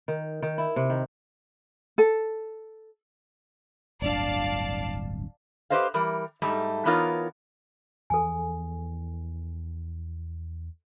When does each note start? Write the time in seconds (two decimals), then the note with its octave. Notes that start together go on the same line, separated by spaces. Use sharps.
0.08 D#3
0.42 D#3
0.58 E4
0.76 C3
0.90 D#3
1.98 A4
4.02 D1 G1 D4 D5 F5 A5
5.70 G4 B4 C5 D#5 F5
5.94 E3 G3 A#4
6.42 G#2 G3 A3 D#4 A4
6.85 E3 B3 D#4 F4 A#4 C#5
8.10 E2 E3 F3 A4 G#5